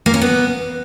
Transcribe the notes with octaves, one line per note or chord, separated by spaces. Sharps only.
A#3
C#4
B3